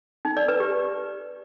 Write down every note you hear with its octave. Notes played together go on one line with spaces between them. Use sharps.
D#4
D5
B4
G4